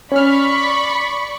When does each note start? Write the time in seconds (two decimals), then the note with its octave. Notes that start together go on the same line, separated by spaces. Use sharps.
0.12 C#4 D5 B5 C#6 F6